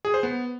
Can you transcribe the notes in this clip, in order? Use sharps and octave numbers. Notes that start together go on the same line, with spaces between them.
G#4
C5
B3